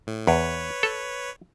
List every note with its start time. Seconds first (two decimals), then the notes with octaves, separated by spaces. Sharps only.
0.07 A2
0.27 E2 B4 C#5
0.83 A4